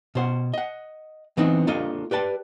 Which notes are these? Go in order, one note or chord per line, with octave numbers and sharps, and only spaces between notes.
B2 C5 F#5
D#5 F#5
E3 B3 C4 D4 D#4
A#3 D4 F4 A4 D#5
G4 B4 D5 A5